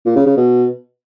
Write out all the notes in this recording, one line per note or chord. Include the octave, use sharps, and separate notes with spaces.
A#2
C#3
C#3
B2